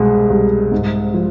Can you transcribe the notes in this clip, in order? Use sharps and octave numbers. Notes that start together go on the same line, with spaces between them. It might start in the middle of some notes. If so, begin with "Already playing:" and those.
Already playing: C2 B2 G#3
C2
G#2
F3